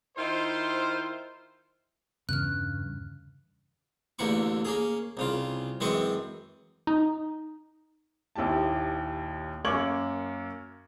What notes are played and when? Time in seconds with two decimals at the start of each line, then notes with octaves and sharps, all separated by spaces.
0.16 D#3 E4 F4 C5
2.29 E2 G2 C#3 F6 F#6
4.19 A1 E2 D3 A#3 E4 C#6
4.65 A#3 C#4 G#4
5.17 C2 C#3 F4
5.80 F#2 E3 G#3 C4 D#5 C#6
6.87 D#4
8.36 A#1 D#2 E4 G4 A5
9.65 F#2 A#3 C#6 D6 G#6 F#7